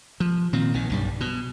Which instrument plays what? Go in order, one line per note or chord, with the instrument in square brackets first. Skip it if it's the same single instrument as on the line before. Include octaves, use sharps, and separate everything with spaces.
[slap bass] F3
A#2 D#3 C4
A#1 D#3
B1 G2 G3
B2